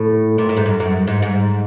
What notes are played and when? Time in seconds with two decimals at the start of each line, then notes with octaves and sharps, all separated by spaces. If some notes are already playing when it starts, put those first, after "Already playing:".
Already playing: A2
0.38 A#2
0.49 A2
0.57 G#2
0.66 F#2
0.80 F#2
1.07 G#2
1.22 G#2